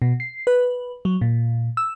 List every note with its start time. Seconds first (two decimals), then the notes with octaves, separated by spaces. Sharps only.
0.02 B2
0.20 C7
0.47 B4
1.05 F#3
1.21 A#2
1.77 E6